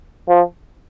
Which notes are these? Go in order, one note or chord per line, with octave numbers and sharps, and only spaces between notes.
F3